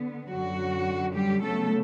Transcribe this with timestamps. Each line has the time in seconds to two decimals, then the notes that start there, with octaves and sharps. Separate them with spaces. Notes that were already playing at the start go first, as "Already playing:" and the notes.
Already playing: D3 B3
0.30 F#2 D3 F#3 F#4
1.15 G3 G4
1.43 C#3 F#3 A3 B3 A4